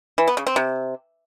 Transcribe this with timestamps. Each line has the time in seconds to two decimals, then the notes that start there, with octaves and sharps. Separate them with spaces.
0.18 E3
0.27 B3
0.37 C#3
0.47 C4
0.56 C3